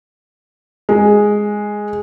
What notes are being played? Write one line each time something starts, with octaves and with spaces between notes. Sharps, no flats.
G#3